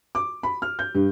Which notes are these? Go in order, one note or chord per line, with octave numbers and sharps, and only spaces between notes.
D6
B5
F6
G6
G2